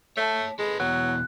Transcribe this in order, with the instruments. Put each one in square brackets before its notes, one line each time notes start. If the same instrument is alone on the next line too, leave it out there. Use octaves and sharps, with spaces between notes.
[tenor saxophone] A3 [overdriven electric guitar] C#5 A5
[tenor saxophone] G#3 [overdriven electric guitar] A4 B4
[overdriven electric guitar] E2 B2 [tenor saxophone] F#3 [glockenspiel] F#6